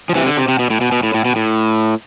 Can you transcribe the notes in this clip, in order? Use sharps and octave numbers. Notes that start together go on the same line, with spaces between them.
F3
C3 E3
D3
C3
C3
B2
A2
B2
B2
A2
A2
B2
A2